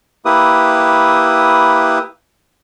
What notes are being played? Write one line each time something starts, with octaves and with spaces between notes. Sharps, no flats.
A#3 E4 G4 B4 D#6